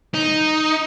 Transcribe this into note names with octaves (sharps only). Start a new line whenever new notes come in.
D#4